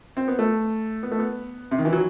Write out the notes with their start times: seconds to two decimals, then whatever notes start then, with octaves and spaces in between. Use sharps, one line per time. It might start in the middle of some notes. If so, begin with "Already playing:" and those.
0.17 C4
0.28 B3
0.39 A3
1.03 B3
1.11 A3
1.19 B3
1.71 C3
1.78 D#3
1.85 E3
1.93 F#3